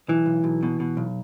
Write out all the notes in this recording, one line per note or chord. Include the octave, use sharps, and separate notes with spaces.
B1 E3
B1
B1
B2
B2
B1